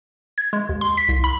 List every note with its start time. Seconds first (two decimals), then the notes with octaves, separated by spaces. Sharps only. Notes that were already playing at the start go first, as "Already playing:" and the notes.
0.38 G#6
0.53 G#3
0.69 D#2
0.81 C6
0.97 B6
1.09 C2
1.24 B5